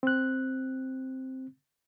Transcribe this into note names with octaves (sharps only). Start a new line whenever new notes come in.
C4 F#6